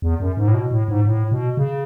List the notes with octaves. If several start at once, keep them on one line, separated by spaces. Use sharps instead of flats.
E2
F#2
G#2
A2
B2
A2
G#2
A2
B2
C#3